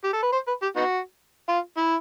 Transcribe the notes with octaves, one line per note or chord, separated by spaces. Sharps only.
G4
A4
B4
C5
B4
G4
B3 D#4 F#4
F4
E4